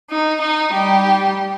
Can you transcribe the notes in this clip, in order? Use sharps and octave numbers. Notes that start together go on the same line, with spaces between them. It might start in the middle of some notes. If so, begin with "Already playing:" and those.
D#4
D#4
G3 G4